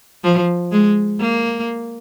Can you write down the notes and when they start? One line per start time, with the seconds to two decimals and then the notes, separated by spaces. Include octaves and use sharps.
0.24 F3
0.72 G#3
1.20 A#3